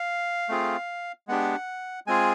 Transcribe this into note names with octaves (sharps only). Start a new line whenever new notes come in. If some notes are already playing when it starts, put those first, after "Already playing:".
Already playing: F5
A3 C4 F4 G#4
G#3 B3 D4 G4 F#5
G#3 C4 F4 G#4 G#5